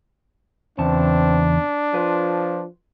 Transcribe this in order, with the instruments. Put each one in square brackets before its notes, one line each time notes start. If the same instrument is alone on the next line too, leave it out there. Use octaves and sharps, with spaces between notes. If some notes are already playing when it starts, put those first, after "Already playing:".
[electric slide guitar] E2 C#3 A5 [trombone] C4 [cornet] D4
[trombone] F3 [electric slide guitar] F4 B4